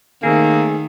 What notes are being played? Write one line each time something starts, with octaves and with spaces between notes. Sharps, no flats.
D#3 A3 A#3 C4 G#4